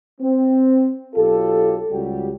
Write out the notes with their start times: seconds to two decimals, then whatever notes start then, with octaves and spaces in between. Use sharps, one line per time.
0.21 C4
1.15 B1 F4 G4 A4
1.90 C#2 G3 F#4 G4